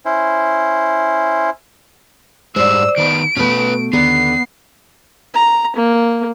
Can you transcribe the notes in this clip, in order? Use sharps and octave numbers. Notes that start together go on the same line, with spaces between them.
C#4 E4 C5
G#2 G3 G#3 C5 D5 E6
D#3 B3 D7
B2 A3 C#4 B4
D#2 D3 B3 A#5 C7
A#5
A#3